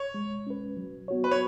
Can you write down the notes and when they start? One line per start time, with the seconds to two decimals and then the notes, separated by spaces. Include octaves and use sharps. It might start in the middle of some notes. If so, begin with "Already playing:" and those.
Already playing: C#5
0.14 G#3
0.47 C#4 B4
0.77 F#3
1.08 B3 F#4 C#5
1.24 B4
1.31 C#5